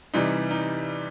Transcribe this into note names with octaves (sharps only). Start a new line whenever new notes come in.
C3 E3 G3 D#4
D#4